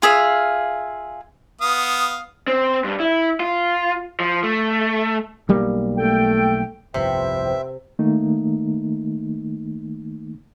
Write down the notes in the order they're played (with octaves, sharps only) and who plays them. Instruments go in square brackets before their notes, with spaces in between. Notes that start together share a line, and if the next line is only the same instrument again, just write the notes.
[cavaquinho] F4 G#4 E5 F5
[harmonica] B3 F5 D#6
[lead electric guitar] C4
G2
E4
F4
F3
A3
[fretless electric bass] B1 G3 A#3
[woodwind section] A3 A4 G5
[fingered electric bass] G1 C2 F2 [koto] C3 [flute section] B4 C5 G5 [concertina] E5
[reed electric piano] D#3 A3 A#3 D#4